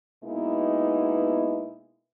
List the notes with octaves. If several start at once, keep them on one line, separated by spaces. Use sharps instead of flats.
B2 G#3 A#3 B3 D#4 E4